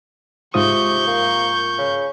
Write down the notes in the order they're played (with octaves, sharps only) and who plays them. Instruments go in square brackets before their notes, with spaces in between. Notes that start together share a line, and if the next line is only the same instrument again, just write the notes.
[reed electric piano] G#2 F4 D#6 [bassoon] C3 [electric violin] C#6 G6
[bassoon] A#3
C#3